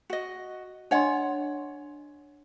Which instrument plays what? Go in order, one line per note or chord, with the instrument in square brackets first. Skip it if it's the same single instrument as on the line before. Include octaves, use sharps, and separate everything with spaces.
[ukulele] F#4 D#5
[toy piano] D4 D#5 C6 [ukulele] C#5 F#5